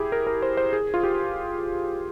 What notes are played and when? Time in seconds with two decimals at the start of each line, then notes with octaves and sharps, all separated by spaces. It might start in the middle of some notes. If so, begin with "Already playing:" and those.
Already playing: E4 G4 G#4
0.12 A#4
0.27 A#4
0.42 C5
0.57 C5
0.73 G#4
0.94 F4
1.03 G4